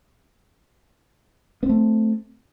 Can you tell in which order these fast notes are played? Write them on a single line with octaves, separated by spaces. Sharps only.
B3 C4 A3